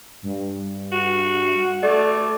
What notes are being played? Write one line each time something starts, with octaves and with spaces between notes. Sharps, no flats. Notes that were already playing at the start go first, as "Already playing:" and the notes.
G2
F#4
A3 D5